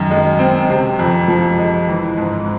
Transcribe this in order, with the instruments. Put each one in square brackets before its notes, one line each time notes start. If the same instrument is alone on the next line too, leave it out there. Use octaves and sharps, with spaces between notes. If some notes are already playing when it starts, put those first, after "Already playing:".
Already playing: [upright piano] F#2 D#3
G#3
C4
C3
F2
F3
G#3
E3
G#2